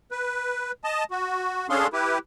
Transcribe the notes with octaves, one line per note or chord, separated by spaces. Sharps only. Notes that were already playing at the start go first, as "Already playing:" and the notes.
B4
D#5 A5
F#4
C#4 D4 G#4 A4 F5 C6
E4 G4 B4